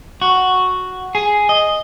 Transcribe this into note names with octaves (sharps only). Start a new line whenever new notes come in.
F#4
G#4
D#5